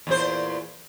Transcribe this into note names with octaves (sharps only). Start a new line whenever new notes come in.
E2 A#2 C5